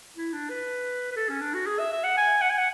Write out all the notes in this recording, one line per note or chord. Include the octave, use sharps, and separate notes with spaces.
E4
D4
B4
B4
A4
C#4
D4
F#4
G#4
E5
E5
F#5
G#5
F#5
G#5
F#5